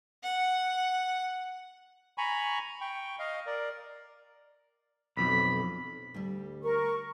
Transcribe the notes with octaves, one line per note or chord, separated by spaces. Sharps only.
F#5
G#5 A#5 B5 C#6
G5 C#6
D#5 F5
A#4 D5
B1 F2 B5
D2 G3
A#4 C#6